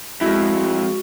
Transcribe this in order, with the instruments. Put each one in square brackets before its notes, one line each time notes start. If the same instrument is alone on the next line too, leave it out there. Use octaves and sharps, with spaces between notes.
[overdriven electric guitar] F2 [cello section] G#3 [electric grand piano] E4 [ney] F#4